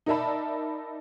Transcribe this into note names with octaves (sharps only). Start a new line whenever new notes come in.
D#4 A#4 D5 E5 A5 B5